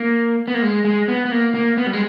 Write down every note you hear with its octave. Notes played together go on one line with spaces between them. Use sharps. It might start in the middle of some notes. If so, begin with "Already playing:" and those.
Already playing: A#3
B3
A#3
G#3
G#3
B3
B3
A#3
A#3
B3
G3
G#3